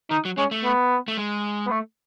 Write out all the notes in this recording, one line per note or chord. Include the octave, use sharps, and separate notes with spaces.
D#3 D#4
F#3
G#3 C#4
A3
B3
A3
G#3
B3
A3